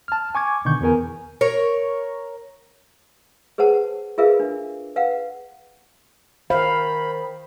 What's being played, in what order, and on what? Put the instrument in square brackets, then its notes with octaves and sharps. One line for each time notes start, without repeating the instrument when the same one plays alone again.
[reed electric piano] A5 F6
G#5 C#6 D6 G#6
B2 D3 D#3 C#6 G6
E2 B3 A#4 G#5
[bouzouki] A#4 C#5
[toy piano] G#4 B4 C5 F#5 A5
F4 G#4 A#4 B4 E5 F5
D4
B4 F5 F#5
[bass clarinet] D#3 [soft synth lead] C5 [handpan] F5 [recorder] B5